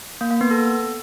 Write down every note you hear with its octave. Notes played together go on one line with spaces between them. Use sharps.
A#3
A#3
B3
A4